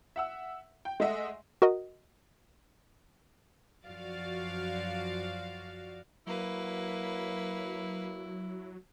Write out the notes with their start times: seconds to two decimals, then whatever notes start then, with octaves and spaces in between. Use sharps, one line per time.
0.16 E5 F#5 E6
0.85 G5
1.00 G#3 A3 D#5 E5 F#5
1.62 F#4 A#4 D#5
3.85 F#2 F3 F#4 D5 F5 A6
6.27 F#3 A#3 E4 B4